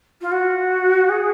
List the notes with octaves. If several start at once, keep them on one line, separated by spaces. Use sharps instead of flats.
F4
F#4
G#4